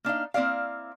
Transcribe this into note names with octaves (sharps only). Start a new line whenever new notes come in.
A#3 D4 D#4 F5
A#3 C4 E4 D5 F5